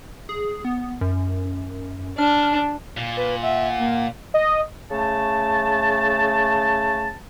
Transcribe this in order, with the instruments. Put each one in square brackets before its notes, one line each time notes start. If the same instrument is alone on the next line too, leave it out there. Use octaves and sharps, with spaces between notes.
[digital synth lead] G#4
B3
F#2
[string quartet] D4 [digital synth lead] F6
[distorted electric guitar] A#2
[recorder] B4
[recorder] E5 [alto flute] F#5
[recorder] A#3
[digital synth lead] D#5
[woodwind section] C#3 A3 A5